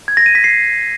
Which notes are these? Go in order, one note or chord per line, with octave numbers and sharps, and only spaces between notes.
G#6
A#6
D#7
B6
C7